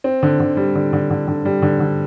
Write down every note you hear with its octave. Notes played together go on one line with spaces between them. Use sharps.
C4
D3
D3
G3
D3
D3
D3
D3
G3
D3
D3